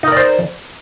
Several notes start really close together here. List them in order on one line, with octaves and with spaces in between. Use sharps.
D#4 A#4 D5 C5